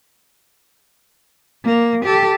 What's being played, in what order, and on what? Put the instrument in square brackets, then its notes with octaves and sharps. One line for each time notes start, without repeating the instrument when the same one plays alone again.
[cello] A#3
G4 A4